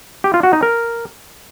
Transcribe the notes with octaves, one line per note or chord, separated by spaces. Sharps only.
G4
F4
F#4
D#4
A#4